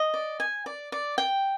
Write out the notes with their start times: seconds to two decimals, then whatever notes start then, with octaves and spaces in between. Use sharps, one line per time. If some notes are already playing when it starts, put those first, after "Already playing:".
Already playing: D#5
0.14 D5
0.40 G#5
0.66 D5
0.92 D5
1.18 G5